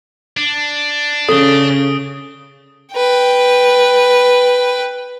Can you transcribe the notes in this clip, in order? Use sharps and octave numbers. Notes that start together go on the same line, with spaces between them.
D4
C#3 A4 D#6 D7 G7
B4 G5